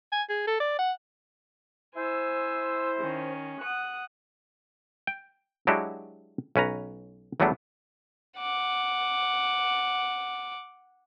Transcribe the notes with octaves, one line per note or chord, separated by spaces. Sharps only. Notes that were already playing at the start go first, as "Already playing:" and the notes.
G#5
G#4
A4
D5
F#5
E4 C5 G#5 E6
D#3 C#4
F#5 D#6 F#6
G5
F#3 G#3 D4 E4 F#4 G4
B1 C#4 B4 A#5
E2 F#3 G3 A3 B3 D4
F#5 D6